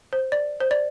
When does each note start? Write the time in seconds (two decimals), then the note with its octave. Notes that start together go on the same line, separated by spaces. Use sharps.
0.13 C5
0.32 D5
0.60 C5
0.71 D5